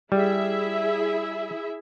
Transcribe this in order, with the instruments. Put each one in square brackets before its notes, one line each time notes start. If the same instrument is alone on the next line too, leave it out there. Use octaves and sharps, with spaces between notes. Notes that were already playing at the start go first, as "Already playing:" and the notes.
[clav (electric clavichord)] G3 [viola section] E4 G#4 E5